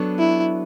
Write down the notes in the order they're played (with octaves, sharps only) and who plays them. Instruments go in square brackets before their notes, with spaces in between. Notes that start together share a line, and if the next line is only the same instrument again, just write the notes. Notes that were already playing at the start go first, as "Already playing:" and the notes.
Already playing: [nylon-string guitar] F#3 B3 D4 A4 C#5
[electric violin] E4